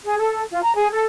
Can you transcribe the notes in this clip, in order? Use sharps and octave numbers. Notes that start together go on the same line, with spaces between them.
G#4
A4
F4
A#5
G#4
A4